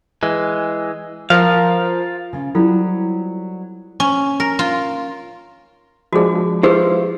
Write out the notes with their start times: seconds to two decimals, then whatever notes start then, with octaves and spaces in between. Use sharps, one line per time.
0.23 E3 G#3
1.30 F3 F4 A#4 F5
2.33 C#3 F4
2.55 F#3 G3 C4 E4 F4 A4
4.00 C#4
4.40 A#4
4.59 F4
6.13 F3 G#3 D4 F#4 G#4
6.63 E4 F4 G4 G#4 B4 C5